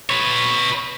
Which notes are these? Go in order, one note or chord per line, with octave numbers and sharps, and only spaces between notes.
B4 C#5